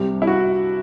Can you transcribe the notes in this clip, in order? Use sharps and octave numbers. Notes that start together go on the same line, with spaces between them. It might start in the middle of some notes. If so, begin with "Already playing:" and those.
Already playing: C2 C3 G3 G4
E4
F#4